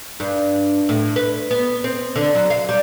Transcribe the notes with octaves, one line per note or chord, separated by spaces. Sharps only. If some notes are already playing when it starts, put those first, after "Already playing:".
G2
A2
B4
B3
C4
D3
F#3
F5
G3